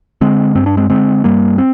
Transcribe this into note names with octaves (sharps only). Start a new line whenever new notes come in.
D3 G#3 C4
G2 C4
D4
G#3 C4
D3 G#3 C4
G2 G3 A#3
C4